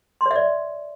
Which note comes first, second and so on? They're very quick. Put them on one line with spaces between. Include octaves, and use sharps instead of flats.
C6 C#5 E5 D5